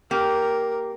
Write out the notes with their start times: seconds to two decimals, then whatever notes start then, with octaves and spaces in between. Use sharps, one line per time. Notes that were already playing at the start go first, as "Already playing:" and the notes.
0.11 A#3 G4 A#4